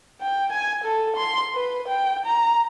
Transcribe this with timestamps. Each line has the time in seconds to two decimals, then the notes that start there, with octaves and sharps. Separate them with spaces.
0.21 G5
0.52 G#5
0.84 A4
1.16 C6
1.55 B4
1.88 G5
2.26 A#5